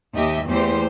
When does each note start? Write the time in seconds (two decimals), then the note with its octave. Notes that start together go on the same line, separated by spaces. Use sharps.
0.14 D#2 G4 D#5 E5
0.48 E2 E3 A3 A#3 G4 C5